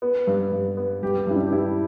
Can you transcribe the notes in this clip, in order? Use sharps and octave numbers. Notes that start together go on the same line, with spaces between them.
B3
G2
G2
B3
G2 G4
G4
G2 E4
D4
G4
G3 E4